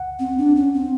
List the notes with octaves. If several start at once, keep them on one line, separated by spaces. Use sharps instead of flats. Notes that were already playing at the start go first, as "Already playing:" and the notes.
Already playing: F#5
C4
D4
C#4
C4